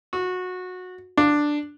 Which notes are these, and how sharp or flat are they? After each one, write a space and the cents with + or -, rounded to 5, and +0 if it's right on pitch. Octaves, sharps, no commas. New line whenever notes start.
F#4 -20
D4 +5